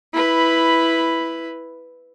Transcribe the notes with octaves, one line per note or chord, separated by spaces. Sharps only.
E4 B4